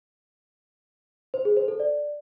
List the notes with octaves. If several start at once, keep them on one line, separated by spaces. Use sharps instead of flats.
C5
G#4
C5
A4
D5